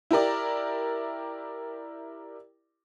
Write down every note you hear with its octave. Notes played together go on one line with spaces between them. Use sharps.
E4 G4 A#4 D5